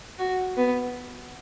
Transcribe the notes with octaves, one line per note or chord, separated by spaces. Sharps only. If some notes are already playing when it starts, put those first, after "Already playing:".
F#4
B3